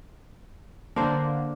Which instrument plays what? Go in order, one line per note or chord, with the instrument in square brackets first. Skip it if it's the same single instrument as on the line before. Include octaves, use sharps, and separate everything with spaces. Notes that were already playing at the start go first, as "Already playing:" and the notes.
[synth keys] D3 A#3 [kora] D4 C5